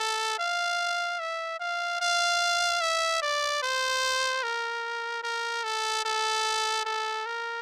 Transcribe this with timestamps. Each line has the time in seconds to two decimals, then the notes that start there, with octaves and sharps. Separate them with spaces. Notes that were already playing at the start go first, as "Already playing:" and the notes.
Already playing: A4
0.39 F5
1.20 E5
1.60 F5
2.01 F5
2.81 E5
3.22 D5
3.63 C5
4.43 A#4
5.23 A#4
5.64 A4
6.05 A4
6.85 A4
7.26 A#4